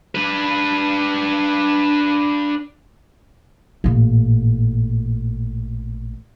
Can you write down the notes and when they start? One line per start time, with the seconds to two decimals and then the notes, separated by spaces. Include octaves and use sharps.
0.15 D4 B4
3.84 A1 A#2